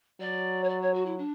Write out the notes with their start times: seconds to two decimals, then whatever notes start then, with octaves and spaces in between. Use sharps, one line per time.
0.20 F#3 D5
0.64 C#5
0.69 D5
0.81 C#5
0.94 F#4
1.06 E4
1.18 D4